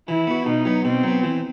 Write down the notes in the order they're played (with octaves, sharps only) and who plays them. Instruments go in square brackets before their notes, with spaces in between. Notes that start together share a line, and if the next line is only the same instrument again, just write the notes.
[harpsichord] E3 [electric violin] E4
[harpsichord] B3 F#4
[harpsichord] B2 [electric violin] D#4
[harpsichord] F#3 B3
[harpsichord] B2 [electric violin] C4
[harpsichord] F#3 B3
E3